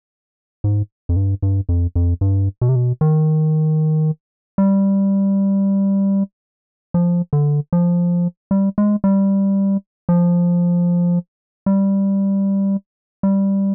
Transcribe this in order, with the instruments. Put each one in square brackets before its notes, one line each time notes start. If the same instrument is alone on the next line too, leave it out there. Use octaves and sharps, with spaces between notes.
[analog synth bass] G#2
F2
G2
G2
F2
F2
G2
B2
C3
B2
D#3
G3
F3
D3
F3
G3
G#3
G3
F3
G3
G3